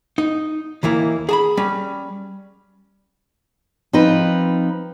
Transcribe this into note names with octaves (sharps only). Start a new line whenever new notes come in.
D#4
D#2 E3 A#3 E4
G#4 A5 B5
G3 C#4
F3 C4 D#4 B4